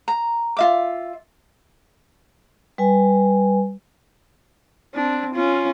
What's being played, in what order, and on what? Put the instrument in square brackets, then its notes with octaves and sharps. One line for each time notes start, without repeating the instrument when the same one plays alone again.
[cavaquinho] A#5
F4 E5 D6
[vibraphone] G3 B4 G#5
[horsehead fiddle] C4 D4
C#4 F4